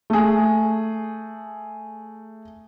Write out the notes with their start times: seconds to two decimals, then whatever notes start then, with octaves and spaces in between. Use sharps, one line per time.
0.10 A3 G#4